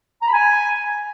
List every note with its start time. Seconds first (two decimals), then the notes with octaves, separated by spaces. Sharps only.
0.22 A#5
0.28 B5
0.34 G#5